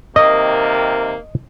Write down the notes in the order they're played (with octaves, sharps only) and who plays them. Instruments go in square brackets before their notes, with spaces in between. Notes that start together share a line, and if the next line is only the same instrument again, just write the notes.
[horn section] C3 D#3 A#3 [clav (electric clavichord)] D#5